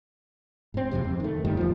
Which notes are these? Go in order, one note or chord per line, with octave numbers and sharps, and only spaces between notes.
G#2 C4
E1 A#1 F2 C3
F2
D#3 A3
G2 A#2 D#3 G3
E2 F3